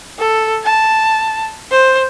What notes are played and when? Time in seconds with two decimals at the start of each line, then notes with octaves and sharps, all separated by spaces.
0.19 A4
0.64 A5
1.71 C5